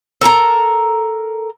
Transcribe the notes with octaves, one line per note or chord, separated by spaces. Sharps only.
A4 A#4 A5 A#5